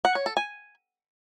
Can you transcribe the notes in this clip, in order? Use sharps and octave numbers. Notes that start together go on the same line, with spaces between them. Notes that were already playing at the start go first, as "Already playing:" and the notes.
F#5
C#5
A4
G#5